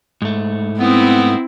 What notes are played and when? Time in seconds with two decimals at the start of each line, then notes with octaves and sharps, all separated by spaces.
0.22 G#2 A3
0.79 B3 C4 E4